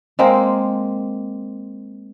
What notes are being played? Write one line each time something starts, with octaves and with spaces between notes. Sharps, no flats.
G#3 A#3 C4